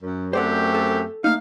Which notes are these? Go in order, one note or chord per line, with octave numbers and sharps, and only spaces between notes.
F#2
F#2 A3 C4 G4 C5 D5 F#5
A4
A3 A#3 D#4 F5